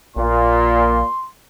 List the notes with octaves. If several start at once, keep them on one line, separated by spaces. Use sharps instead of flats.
A#1 A#2 C6